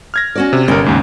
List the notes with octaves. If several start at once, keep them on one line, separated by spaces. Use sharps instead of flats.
F6 G#6 A#6
C#4 F#4 D5
C3
G1 C#4 D4 G4 A#4
D#2 G#2 C#3